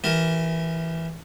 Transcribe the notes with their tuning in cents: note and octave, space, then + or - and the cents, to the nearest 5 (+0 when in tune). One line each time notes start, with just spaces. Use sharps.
E3 +0 G4 -40 A#4 +0